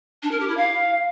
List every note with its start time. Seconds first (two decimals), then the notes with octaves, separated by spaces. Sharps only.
0.23 D4
0.31 A#4
0.40 G4
0.48 E4
0.57 F5